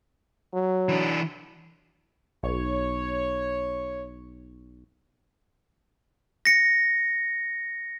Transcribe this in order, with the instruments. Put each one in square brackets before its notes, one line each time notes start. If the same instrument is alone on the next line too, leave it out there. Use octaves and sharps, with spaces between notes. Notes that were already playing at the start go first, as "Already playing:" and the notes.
[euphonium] F#3
[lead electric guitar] E3 D4
[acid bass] B1 [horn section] C#5
[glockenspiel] A#6 C#7